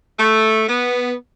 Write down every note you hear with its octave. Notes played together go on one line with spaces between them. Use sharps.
A3
B3